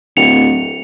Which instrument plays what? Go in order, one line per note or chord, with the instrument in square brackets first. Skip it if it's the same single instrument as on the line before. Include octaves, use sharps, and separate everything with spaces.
[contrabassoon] D1 [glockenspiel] C#7 F7